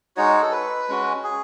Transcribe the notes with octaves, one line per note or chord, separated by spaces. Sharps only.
G#3 D#4 F#4 C#5
A4
B4
G#3 C#4 F#4
G#4